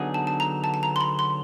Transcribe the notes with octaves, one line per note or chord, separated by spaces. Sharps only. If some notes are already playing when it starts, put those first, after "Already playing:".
Already playing: D3 F#3 B3 D#4 G#4
A5
A5
A#5
A5
A5
A#5
C6
B5
C6